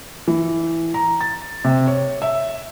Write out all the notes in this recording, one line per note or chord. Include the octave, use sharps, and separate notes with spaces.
E3
A#5
A6
C3
C#5
E5